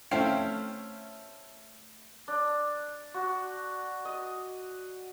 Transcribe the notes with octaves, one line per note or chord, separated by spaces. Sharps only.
A3 C4 C#4 E4 F5 G5
D4
F#4
D#5